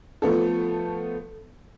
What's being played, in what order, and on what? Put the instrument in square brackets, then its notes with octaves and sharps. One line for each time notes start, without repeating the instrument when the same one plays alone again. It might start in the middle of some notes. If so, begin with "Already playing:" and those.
[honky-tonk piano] F3 A3 B3 A4